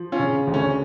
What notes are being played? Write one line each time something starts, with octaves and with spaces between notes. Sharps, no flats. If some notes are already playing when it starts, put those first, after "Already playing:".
Already playing: F3
C#4 F4
C#3
D2
A3 C#4